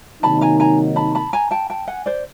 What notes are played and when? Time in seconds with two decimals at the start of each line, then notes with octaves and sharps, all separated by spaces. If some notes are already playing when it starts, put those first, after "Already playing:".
0.23 C3 D#3 F#3 A#3 D#4 A5 B5
0.41 G#5 A#5
0.60 G#5 A#5
0.96 A5 B5
1.15 A5 B5
1.33 G#5 A#5
1.51 G5 A5
1.70 G5 A5
1.88 F#5 G#5
2.06 C5 D5